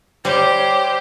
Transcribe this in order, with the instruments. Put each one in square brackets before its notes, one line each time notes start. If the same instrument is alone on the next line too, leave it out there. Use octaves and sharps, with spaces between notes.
[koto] G3 [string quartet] G4 [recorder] C5 [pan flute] C#5